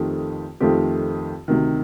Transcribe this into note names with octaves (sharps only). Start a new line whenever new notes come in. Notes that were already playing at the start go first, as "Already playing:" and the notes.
Already playing: F2 D#3 A3 C4 G4
F2 D#3 A3 C4 G4
D2 C3 D#3